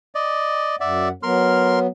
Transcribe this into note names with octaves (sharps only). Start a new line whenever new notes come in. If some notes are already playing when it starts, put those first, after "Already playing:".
D5 D#5
F#2 D5 E5 F#5
F#3 B3 A#4 C6 F6